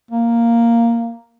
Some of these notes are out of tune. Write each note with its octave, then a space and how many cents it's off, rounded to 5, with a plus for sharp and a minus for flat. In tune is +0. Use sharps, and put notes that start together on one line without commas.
A#3 -5